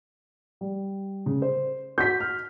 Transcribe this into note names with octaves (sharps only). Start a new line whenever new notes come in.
G3
C#3
C5
F#4 G6 B6
F6